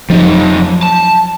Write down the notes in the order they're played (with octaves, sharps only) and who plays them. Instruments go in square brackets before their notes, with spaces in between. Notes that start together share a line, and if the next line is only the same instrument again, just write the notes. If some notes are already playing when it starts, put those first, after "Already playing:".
[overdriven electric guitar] F2 D#4 [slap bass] F3 F#3
[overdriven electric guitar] A5